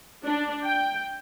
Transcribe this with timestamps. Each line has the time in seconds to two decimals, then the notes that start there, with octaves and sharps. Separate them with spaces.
0.24 D4
0.64 G5